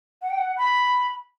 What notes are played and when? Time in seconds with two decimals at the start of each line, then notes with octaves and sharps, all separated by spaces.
0.22 F#5
0.30 G5
0.38 F#5
0.58 B5